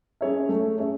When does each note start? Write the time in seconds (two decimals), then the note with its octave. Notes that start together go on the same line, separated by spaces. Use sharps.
0.21 C#4 G#4 C#5 E5
0.49 A3
0.78 C#4 G#4 C#5 E5